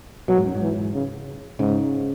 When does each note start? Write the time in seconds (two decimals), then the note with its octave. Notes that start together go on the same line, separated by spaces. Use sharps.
0.28 B2 F#3
0.38 G#2
0.46 F#2
0.54 G#2
0.61 E3
0.94 C#3
1.59 G#2 C#3